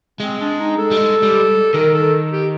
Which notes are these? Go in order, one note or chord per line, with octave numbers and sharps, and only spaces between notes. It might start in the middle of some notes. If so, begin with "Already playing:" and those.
G#3 C4
D4
D#4
A4
G3
G#3
G3
D#3 A#4
A4
G4